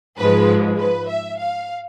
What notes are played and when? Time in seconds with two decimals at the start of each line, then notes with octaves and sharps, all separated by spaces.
0.17 G#2 F3 G#3 B4
0.78 B4
1.09 E5
1.39 F5